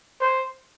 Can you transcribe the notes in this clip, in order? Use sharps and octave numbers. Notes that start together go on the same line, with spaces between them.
C5